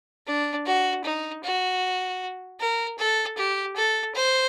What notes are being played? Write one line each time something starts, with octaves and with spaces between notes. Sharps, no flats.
D4
F#4
D#4
F#4
A#4
A4
G4
A4
C5